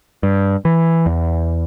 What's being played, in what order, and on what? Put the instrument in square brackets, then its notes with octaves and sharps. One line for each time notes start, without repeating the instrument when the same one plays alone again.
[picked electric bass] G2
E3
E2